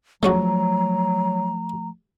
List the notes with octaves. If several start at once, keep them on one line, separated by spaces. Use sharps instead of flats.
F3 F#3 G#3 A3 C#4 F#4 A#5